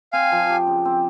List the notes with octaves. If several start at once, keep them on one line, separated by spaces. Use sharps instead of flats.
C4 F5 G#5
F3
G4
C#3
C4